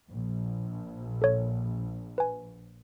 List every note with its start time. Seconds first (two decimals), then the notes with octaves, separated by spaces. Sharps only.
0.10 A#1
1.22 A4 C#5
2.18 B4 G#5